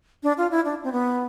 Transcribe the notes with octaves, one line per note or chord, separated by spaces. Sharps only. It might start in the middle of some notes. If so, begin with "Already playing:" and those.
D4
F4
E4
D4
C4
B3